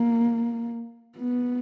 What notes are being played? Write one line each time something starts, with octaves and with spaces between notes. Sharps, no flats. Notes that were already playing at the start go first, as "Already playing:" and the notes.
Already playing: A#3
B3